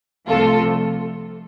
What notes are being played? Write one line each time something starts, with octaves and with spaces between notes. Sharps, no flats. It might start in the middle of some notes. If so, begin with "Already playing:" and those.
C2 C3 F3 A3 F4 A4